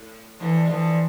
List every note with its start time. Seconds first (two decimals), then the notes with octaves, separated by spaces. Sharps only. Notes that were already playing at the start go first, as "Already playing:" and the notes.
Already playing: A2
0.40 D3 E3 F3
0.64 G#3
0.69 D3 E3 F3